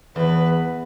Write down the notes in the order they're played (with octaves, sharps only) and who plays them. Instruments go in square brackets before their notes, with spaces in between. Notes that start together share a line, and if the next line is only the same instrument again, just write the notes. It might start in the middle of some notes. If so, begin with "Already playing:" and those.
[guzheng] E2 [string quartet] B4